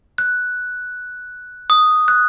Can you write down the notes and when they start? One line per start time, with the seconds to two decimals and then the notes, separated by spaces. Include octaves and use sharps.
0.18 F#6
1.70 D#6
2.08 F#6